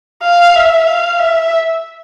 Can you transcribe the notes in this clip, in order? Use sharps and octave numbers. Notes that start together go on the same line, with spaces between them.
F5
E5
F5
E5